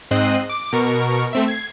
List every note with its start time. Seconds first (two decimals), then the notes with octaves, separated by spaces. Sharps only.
0.11 G#2 C4 D#5 F#6 C7 D#7
0.50 D6
0.73 B2 A#4 C#6
1.33 A3 C4 E5
1.48 G#6 C7